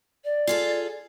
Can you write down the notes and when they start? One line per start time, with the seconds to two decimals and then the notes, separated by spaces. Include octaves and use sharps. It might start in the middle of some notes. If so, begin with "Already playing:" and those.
0.25 D5
0.47 F4 G#4 A4